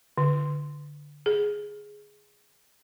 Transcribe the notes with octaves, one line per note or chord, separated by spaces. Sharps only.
D3
G#4